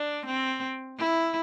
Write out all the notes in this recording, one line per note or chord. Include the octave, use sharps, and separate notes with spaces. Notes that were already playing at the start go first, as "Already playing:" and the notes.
Already playing: D4
C4
E4